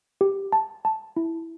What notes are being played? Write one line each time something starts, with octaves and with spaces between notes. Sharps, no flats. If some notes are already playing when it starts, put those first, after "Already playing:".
G4
A5
A5
E4